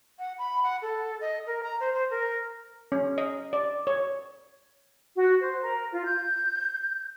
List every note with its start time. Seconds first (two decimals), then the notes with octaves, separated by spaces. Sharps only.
0.19 F#5
0.39 B5
0.63 F#5
0.82 A4
1.21 D#5
1.47 A#4
1.63 A#5
1.80 C5
1.94 C5
2.10 A#4
2.92 C#4
3.18 D#5
3.53 D5
3.87 C#5
5.15 F#4
5.39 C5
5.61 A#4
5.91 F4
6.05 G6